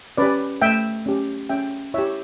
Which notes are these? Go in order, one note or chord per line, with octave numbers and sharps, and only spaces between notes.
C#4 G4 B4 D5
A3 E5 G5
C#4 G4
C#4 E5 G5
E4 G4 C#5 E5